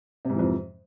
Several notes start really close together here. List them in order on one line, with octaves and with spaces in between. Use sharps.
C3 G#2 E3 F2